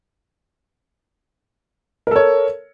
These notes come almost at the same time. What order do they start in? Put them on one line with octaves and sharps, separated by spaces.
A#4 A4 C#5